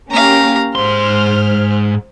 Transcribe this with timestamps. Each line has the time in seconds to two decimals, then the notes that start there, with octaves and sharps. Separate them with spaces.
0.11 A#3 C#4 G4 F5 A#5
0.75 G#2 C5 C6 F6